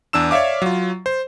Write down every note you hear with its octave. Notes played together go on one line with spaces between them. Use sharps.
E2 D4 E6 E7
C#5 D5 E5 F5 D6
F#3 F4
C5